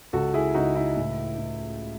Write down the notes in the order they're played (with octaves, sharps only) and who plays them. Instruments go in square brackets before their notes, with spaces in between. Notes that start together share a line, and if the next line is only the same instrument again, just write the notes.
[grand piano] C#2 F#4 A4
E4 G#4
C#2 D#4 F#4
E4
A2
A2